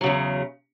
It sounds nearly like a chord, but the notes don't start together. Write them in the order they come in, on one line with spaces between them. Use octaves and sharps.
F#3 C#3 E2